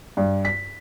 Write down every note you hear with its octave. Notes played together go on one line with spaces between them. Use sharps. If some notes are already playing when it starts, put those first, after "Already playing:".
G2
B6